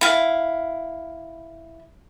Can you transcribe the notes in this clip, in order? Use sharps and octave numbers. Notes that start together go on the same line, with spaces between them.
E4 F5